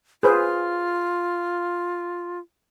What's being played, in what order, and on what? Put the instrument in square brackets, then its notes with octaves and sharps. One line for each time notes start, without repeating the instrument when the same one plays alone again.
[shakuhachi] F4 [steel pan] G#4 B4 C5